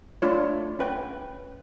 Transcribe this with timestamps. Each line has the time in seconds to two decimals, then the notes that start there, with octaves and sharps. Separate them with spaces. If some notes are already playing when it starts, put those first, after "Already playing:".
0.22 A3 D4 F4 C#5
0.79 C#4 B4 G5